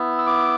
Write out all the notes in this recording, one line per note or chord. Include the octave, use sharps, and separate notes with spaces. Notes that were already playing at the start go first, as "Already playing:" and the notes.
Already playing: B3 E4
E6
D6